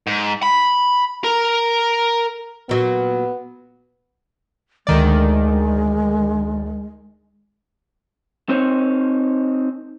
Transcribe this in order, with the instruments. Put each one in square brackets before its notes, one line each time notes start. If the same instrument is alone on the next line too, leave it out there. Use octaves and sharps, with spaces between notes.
[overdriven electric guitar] G#2
B5
A#4
[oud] A#2 F#3 [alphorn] B3
[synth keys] D2 D#3 D5 [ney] G#3
[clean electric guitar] C4 D#4 C5 C#5